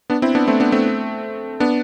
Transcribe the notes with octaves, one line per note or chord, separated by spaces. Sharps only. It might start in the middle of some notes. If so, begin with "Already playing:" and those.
B3 D4
C4 E4
B3 D4
A3 C4
B3 D4
A3 C4
B3 D4